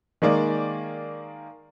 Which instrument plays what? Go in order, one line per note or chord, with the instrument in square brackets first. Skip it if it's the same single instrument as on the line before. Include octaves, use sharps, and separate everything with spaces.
[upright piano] D#3 G#3 A#3 D5